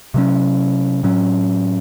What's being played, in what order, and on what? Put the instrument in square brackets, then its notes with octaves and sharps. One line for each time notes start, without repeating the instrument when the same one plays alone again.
[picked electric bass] C3 F#3 C#4
A2 F#3 C#4